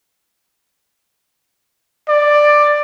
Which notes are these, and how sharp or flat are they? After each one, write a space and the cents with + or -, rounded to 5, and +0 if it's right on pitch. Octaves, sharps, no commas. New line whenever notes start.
D5 +10